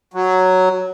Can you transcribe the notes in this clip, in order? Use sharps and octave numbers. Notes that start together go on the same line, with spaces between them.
F#3